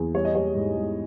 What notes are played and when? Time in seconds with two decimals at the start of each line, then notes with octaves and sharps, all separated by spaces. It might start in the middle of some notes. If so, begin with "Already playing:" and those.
Already playing: E2
0.14 G3 C#5
0.25 D#5
0.35 G3 C#5
0.55 G#2
0.76 G#2